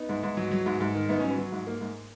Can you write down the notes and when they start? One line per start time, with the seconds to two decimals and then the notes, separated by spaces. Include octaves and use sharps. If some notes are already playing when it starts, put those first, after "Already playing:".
Already playing: B3 D#4
0.09 G#2
0.23 G#2
0.37 F#3
0.51 F#3
0.66 G#2
0.80 G#2
0.95 D#3
1.09 G#2 B3 D#4
1.20 F#3 C#4
1.30 B3
1.38 F#3
1.52 G#2
1.67 A#3
1.81 G#2